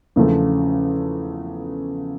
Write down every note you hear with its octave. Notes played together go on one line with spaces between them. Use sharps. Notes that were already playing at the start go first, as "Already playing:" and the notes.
E2 C#3 F3 A3